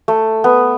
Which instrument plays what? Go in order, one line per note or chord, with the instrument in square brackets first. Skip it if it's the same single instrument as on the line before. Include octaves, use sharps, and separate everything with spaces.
[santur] A3
B3